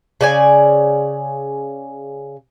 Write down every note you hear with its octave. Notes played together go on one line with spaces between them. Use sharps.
C#3 D5 G#5